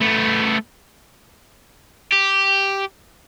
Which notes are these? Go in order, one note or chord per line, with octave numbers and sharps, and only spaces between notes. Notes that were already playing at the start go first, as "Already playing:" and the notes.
A3 B3
G4